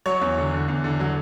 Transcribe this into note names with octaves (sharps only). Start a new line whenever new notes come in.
F#3 C#5
E2
D3
D3
E2
D3
F#3